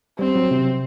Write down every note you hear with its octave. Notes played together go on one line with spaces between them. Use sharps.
G3 C4
F#3
C3